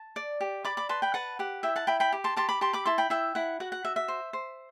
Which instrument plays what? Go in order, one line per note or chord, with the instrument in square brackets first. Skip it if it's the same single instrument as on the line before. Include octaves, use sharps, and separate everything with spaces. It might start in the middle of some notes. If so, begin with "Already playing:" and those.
Already playing: [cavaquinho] A5
D5
G4
D5 B5 D6
B5 D6
B4 A5 C6
G5 B5
B4 F#5 A5
G4 F#5
E4 E5 G5
F#5 A5
E4 G5 B5
G5 B5
G4
A5 C6
G4 A5 C6
B5 D6
G4 A5 C6
B5 D6
E4 A5 C6
G5 B5
E4 E5 G5
E4 F#5
F#4 F#5
F#5
F#4 E5
E5
C5
C5